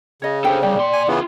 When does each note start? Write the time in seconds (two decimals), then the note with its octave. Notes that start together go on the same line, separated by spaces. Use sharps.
0.22 C#3 C#5 D#5
0.44 D4 G4 A4 C5 G5
0.62 C2 G3 D5 G5
0.75 A#2 C6
0.93 G#5
1.08 C#3 E3 B3 E4 F4